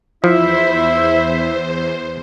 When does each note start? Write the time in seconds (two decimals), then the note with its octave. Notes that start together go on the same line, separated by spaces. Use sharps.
0.24 E2 F3 E4 C5 E5